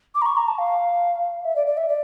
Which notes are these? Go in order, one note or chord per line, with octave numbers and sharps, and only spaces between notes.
D6
A#5
C#6
A#5
A5
F5
E5
D5
D5
E5
D5